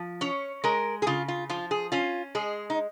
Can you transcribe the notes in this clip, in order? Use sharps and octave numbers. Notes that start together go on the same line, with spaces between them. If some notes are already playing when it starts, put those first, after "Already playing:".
Already playing: F3
C#4 C#5
G#3 A#4
G#4
C#3 F4
F4
F3 F4
G#4
C#4 F4
G#3 G#4
D#4